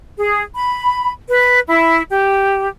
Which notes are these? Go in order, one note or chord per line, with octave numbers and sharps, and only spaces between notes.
G#4
B5
B4
E4
G4